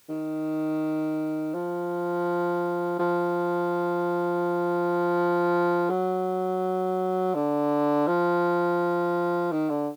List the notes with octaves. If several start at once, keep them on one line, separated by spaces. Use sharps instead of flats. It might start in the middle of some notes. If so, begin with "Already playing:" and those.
D#3
F3
F3
F#3
D3
F3
D#3
D3